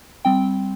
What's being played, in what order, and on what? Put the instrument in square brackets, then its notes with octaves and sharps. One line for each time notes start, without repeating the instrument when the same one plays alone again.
[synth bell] G3 C4 G5